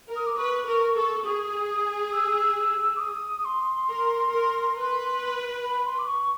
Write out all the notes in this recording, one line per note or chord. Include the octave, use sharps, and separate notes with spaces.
A#4
D#6
D6
B4 C#6
A#4
A4
G#4 D#6
E6
D6
D#6
C6
A#4
A#4
B4
B5
C6
D6
C#6